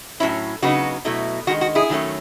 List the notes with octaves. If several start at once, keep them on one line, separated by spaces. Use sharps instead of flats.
A2 F#3 C#4 E4
C#3 F#3 B3 D#4 F#4
B2 F#3 A3 E4
D#3 G#3 D#4 F#4
F#4
E4 G#4
D#3 F#3 A3 C#4